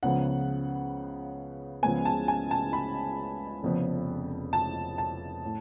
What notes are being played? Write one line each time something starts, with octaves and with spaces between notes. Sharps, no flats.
C#2 C#3 F3 B3 F#5
C#2 C#3 F3 G#3 B3 G#5
A5
G#5
A5
B5
F1 F2 C#3 F3 B3
A5
A5
A2